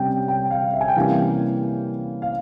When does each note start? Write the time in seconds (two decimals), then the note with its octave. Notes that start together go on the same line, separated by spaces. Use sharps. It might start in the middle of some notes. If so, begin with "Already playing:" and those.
Already playing: C3 G3 C#4 G5
0.28 G5
0.51 F5
0.73 E5
0.81 G#5
0.88 G5
0.96 C3 E3 G3 A#3 C#4 F5
2.22 F5